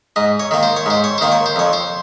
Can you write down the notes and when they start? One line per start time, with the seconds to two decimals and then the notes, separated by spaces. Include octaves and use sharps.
0.16 G#2 D#5
0.40 C#5
0.51 D#3 A#3
0.63 C5
0.76 C#5
0.86 G#2 C5
1.04 C#5
1.18 D#3 A#3 C5
1.32 C#5
1.46 C5
1.56 F2 C#5
1.73 C5